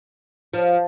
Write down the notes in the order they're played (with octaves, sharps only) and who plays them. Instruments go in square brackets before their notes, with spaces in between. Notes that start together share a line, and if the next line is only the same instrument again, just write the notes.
[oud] F3